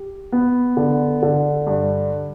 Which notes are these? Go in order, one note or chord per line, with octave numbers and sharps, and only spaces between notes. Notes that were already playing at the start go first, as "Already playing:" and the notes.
Already playing: G4
B3
D3
D3
G2